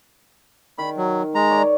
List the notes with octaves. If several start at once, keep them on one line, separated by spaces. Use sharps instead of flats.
D#3 B5
F#3
G#3 A#5
C#5 D5